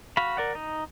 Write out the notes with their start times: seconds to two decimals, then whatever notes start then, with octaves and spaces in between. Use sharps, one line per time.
0.17 F#4 F5 B5
0.37 A#4 D5 F#5
0.55 D#4